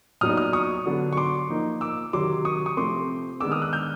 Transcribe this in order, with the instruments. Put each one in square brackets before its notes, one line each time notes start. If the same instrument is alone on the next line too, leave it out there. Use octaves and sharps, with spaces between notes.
[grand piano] A#2 F#3 B3 D#4 D#6 F6
D#6 F6
C#6 D#6
D3 F#3 B3 D4
C#6
C6 D6
F3 A#3 D#4
D6 E6
C3 D#3 F#3 C6 D6
C#6 D#6
C#6 D#6
C3 F3 A3 C4 C6 D6
D#3 G#3 B3 D4 D6 E6
D#6 F6
E6 F#6
F6 G6